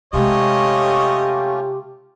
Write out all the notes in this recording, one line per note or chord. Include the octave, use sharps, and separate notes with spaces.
C3 G#3 A3 C#4 F4 G4 C#5 D#5